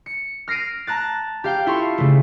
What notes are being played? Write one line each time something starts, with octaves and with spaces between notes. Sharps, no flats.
C#7
F6 A#6 C7 D7 D#7
A5 A#5 F#6 A6
G4 F5 G5
E4 F4 A4 F5 C6 C#6
C#3 A3